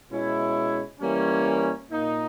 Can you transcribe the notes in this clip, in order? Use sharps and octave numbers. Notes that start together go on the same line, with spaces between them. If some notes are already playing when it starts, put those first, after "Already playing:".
B2 G#3 C#4 E4
E3 G3 A#3 C#4
A#2 A#3 D#4